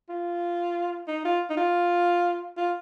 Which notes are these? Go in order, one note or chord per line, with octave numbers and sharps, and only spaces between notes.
F4
D#4
F4
D#4
F4
F4